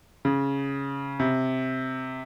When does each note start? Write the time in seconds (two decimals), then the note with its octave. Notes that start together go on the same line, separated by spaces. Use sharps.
0.25 C#3
1.20 C3